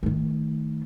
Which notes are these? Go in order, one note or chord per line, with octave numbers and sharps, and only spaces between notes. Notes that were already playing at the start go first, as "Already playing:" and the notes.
D#3 A3